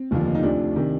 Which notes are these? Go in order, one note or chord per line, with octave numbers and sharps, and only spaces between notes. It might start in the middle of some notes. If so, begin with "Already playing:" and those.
Already playing: C4
F1 D#2 D3 F3
D#4
D2 C3 F3 D4
C3 D#3